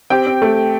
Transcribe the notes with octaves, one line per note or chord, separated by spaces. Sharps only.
C4 G4 G5
C4
A3